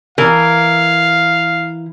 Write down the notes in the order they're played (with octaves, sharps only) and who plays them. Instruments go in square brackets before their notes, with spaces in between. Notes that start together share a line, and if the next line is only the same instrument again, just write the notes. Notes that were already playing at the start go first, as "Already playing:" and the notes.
[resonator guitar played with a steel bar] E3 A#4 [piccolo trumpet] F5